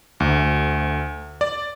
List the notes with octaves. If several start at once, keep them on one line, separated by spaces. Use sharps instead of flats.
D2
D5